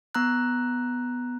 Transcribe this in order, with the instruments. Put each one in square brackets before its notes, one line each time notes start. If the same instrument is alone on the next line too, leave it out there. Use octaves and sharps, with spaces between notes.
[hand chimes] B3 A#5 F#6